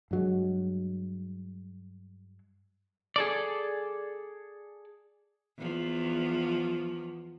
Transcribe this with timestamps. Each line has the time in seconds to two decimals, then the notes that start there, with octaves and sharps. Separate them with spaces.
0.11 G2 F#3 G#3
3.16 G#4 A4 D5
5.58 E2 F3